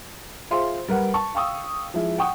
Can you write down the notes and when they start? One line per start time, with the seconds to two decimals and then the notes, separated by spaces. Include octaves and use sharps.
0.50 F4 G#4 C5 E5 F5 C6
0.88 G3 A#4 B4 F#5
1.14 A5 C#6
1.34 F5 G5 C#6 D#6 E6
1.94 F3 G#3 E4
2.18 F#5 G5 C#6 D#6